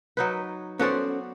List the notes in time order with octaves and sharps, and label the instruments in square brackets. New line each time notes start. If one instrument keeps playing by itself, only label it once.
[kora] F#3 D#4 B4
[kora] B3 F#4 D5 [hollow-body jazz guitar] C#4 A4 C5